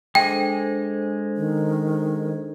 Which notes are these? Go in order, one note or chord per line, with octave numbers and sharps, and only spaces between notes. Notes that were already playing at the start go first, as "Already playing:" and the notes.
G#3 D4 A4 C5 D#5 G5 G#5
D#3